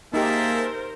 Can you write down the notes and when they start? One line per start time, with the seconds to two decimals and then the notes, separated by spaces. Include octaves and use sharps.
0.14 A#3 D#4 G4 G#4 A#4 C5 E5 A5